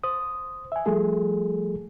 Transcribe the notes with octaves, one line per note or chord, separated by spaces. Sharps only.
C5 D#6
E5 G#5
F3 G3 A3 G#4 A4